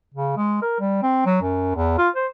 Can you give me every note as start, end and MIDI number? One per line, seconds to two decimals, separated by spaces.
0.14 0.35 49
0.37 0.59 56
0.62 0.77 70
0.79 1.00 55
1.02 1.22 60
1.26 1.38 54
1.42 1.74 42
1.75 1.97 40
1.98 2.09 65
2.16 2.26 72